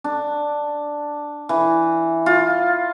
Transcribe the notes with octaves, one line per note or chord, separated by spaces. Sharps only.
D4
E3
F4